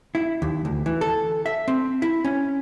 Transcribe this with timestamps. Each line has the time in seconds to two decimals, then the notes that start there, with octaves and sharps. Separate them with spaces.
0.15 E4
0.42 D#2
0.65 D2
0.86 E3
1.01 A4
1.46 E5
1.68 C4
2.02 E4
2.25 C#4